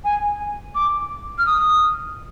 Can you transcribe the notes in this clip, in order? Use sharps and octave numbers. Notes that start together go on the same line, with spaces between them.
G#5
D6
F6
D#6